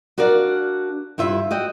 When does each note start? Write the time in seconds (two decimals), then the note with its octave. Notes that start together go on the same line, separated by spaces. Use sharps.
0.18 D4 F#4 A#4 D5 F5
1.18 G2 E4 F4 E5
1.51 F#4 D#5 G5